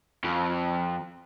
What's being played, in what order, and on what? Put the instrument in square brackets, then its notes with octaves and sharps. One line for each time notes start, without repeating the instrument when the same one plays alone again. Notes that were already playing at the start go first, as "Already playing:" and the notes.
[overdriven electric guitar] F2